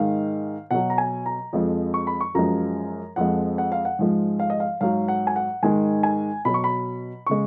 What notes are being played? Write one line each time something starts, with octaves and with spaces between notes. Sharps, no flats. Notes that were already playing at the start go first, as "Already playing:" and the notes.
Already playing: G#2 D#3 G#3 F5
B2 F#3 F#5
A#5
G#5
A#5
F2 F3 G#3
C#6
B5
C#6
F#2 F3 G#3 A#5
F2 F3 G#3 F#5
F#5
F5
F#5
G#2 F3 G#3
F5
D#5
F5
G#2 F#3 F5
F#5
G#5
F#5
G#2 D#3 G#3 G#5
G#5
B2 F#3 B5
C#6
B5
C#3 G#3 C#6